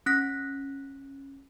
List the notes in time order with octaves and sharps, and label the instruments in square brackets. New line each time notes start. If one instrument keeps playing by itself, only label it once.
[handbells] C#4 F#6 A#6 B6